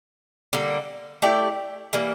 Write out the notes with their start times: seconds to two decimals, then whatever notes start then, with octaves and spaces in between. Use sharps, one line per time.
0.53 D3 G3 A#3
1.22 A3 E4 G4 D5
1.93 E3 G3 A#3